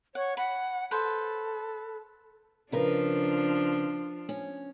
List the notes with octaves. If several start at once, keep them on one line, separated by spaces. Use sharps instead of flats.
C#5 F#5
F#5 B5
A4 B4 C5
C#3 F3 D4 A#4 B4
C#4